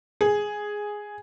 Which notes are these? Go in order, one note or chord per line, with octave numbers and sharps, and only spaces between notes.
G#4